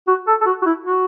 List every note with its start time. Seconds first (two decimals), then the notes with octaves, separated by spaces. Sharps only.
0.07 F#4
0.27 A4
0.41 A4
0.46 F#4
0.62 F#4
0.66 E4
0.86 F#4